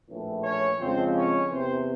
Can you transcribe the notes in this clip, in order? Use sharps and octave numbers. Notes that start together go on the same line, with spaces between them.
A#1 A2 E3
C#4 C#5
F2 C#3 F3 G#3 C4 C5
C#4 C#5
E2 C3 E3 C4 C5